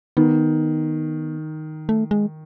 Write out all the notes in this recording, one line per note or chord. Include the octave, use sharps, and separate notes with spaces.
D#3 B3
A3
G#3